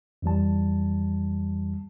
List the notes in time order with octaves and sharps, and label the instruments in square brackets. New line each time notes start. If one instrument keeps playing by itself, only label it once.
[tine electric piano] F2 E3 G3 A5